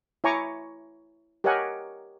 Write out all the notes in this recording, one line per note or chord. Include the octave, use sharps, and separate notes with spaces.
E4 C#5 G#5 A#5 C#6 D6
G4 A#4 C#5 D#5 F#5 G#5